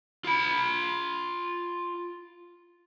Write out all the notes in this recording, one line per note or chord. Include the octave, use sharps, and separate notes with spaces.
F4 B5